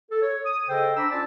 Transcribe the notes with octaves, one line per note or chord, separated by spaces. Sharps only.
A4
C#5
D#6
C#3 A4 C5 D#5 G5
D4 C5 A#5 B5 D6 E6
C#4 F4 D5 A5